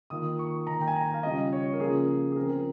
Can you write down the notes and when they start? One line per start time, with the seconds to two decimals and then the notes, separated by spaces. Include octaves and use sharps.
0.10 D#3 A#3 F4 D#6
0.39 C#6
0.67 D#3 A#3 D#4 A#5
0.81 G5
0.88 G#5
0.96 A#5
1.14 F5
1.23 C#3 G3 C#4 F4 D#5
1.53 C#5
1.73 A#4
1.80 C#3 F3 A#3 C#4 F4 G#4
2.32 G#4
2.36 C#3 F3 C4 A#4